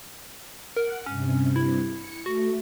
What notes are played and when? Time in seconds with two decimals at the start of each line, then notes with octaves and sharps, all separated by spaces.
0.76 A#4 F#5
1.06 G2 C3 C#4
1.56 E4
1.93 C#7
2.26 A3 F#4